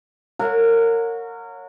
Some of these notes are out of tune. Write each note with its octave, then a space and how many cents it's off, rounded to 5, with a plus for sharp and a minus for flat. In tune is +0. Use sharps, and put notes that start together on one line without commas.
A#4 -25 C#5 +0 F#5 -35